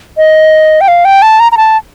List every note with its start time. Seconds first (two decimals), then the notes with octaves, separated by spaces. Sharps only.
0.17 D#5
0.81 G5
0.88 F5
1.05 G5
1.22 A5
1.40 A#5
1.52 A#5
1.57 A5